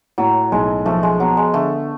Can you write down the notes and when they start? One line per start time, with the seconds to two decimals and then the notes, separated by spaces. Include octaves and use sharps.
0.18 A2 F#3
0.52 B1 G#3
0.86 F3 A3
1.03 G#3
1.20 F#3 B3
1.37 G#3
1.54 D3 A3